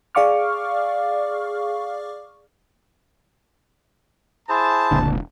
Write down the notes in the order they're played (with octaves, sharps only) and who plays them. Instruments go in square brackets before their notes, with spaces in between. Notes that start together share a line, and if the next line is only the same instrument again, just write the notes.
[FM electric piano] G#4 D5 F5 C#6 D6 F6
[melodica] E4 G#4 C5 [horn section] A5
[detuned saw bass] E1 [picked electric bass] C#2 A#2 D3